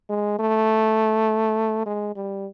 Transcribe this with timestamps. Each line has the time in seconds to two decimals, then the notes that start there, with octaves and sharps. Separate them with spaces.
0.10 G#3
0.39 A3
1.86 G#3
2.16 G3